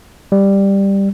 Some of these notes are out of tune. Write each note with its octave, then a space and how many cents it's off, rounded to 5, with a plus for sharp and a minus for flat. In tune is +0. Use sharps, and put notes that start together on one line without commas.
G3 +5